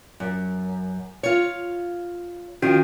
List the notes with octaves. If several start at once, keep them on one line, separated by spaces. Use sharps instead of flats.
F#2
F4 C#5
D#3 F3 C#4 F4 F#4